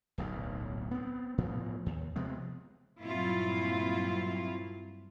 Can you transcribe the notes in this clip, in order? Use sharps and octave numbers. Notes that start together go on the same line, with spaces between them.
D1 B1 A#2
B3 C4
A2 F3 B3
D#2
C3 F3 G#3 B3
G2 A#2 F#3 C4 E4 F4